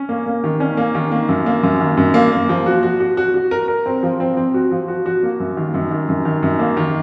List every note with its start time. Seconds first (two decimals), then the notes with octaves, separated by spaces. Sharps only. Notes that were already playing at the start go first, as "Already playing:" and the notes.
Already playing: C#4
0.09 A#3
0.26 A#3
0.44 D#3
0.60 C#4
0.77 A#3
0.95 D#3
1.12 A#3
1.29 F#2
1.46 A#3
1.63 F#2
1.80 D#3
1.97 F#2
2.14 A#3
2.32 A#3
2.49 F3
2.66 F#4
2.83 F#4
3.00 F#4
3.17 F#4
3.34 F#4
3.51 A#4
3.68 A#4
3.86 C4
4.03 F3
4.20 C4
4.37 C4
4.54 F#4
4.71 F3
4.88 F#4
5.06 F#4
5.23 A#3
5.40 F#2
5.57 D#3
5.74 F#2
5.91 D#3
6.09 F#2
6.25 D#3
6.43 F#2
6.59 A#3
6.77 D#3